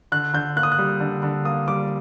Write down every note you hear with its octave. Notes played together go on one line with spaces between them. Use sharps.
D3 F#6
D3 G6
A#3 F#6
D#6
F#6
G3
D3
D3
A#3 D#6
G3 D6